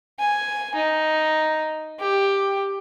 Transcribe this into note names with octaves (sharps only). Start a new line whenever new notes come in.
G#5
D#4
G4